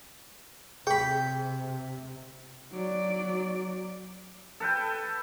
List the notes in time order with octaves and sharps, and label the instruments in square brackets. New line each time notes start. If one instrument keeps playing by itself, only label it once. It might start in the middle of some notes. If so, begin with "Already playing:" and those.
[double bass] C3 [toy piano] G#4 [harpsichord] G5 B5
[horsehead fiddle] F#3 D5
[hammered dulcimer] A4 B4 G5